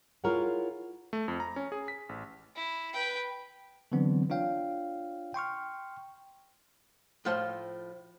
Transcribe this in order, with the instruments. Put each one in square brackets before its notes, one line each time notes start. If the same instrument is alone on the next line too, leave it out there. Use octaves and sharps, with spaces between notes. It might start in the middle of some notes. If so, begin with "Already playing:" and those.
[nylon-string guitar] E4 F4 G#4 A#4 C#5 F#5
[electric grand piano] A3
F2
A#5
C#4
G#4
B6
A1
[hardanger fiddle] E4
B4 G5
[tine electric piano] D3 E3 F#3 B3 C4 D4
D4 F4 C#5 F5 G5
G5 C6 C#6 F6
[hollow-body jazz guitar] A2 F3 F4 C5 C#5 A5